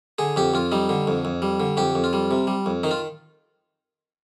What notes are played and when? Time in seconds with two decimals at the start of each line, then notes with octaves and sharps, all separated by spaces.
0.18 D3 G#4
0.36 F2 G4
0.54 F2 F4
0.72 G3 D#4
0.89 D3
1.08 F2
1.25 F2
1.42 G3
1.60 D3
1.77 F2 G4
1.95 F2
2.04 F4
2.13 G3
2.31 C3
2.47 G3
2.66 F2
2.83 D#3 D#4
2.91 F4